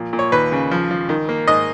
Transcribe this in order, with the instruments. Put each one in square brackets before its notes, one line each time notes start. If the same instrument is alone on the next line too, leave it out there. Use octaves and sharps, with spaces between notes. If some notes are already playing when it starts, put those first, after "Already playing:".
Already playing: [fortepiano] A#2 F3
A#2
C#5
D#2 B4
C#3
F3
F3
D#3
A#3
G#2 D#5